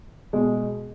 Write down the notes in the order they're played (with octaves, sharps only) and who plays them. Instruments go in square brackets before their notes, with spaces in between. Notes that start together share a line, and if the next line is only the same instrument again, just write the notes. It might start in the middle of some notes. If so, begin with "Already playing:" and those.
[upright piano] B2 G#3